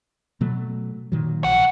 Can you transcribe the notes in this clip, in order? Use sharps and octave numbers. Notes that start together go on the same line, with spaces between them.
B2 F#3 A3
A#2 D#3 F#3
A#1 C#3 F#5